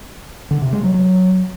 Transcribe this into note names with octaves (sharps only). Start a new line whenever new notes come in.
D3
C3
G#3
F#3
F#3